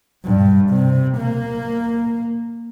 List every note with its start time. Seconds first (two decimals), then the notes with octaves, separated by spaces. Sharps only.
0.25 G2
0.70 C3
1.18 A#3